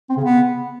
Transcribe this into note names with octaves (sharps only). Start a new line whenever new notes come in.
C4
C#3
B3